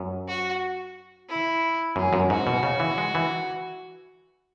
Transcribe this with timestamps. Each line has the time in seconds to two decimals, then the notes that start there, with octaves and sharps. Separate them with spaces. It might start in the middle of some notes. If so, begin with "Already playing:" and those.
Already playing: F#2
0.27 F#4
1.28 E4
1.96 F#2 G#4
2.13 F#2
2.30 G#2 F#4
2.47 B2
2.63 C#3
2.80 E3
2.98 G#3
3.15 E3